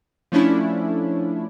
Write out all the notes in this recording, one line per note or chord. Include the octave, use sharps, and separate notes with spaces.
F3 A3 C#4 D4 E4